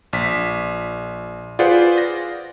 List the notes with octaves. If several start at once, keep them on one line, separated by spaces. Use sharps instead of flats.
A#1 B6
F4 G#4 B4 C5 D5 F#5
A#6